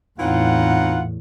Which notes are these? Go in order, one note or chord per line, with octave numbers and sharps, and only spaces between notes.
E2 A2 E3 F#3 C4 D#4 F4 F#5